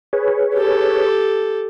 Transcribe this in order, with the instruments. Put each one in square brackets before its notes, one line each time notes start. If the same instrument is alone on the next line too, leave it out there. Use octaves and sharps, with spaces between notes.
[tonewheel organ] G#4 B4 C#5
[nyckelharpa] G4 A4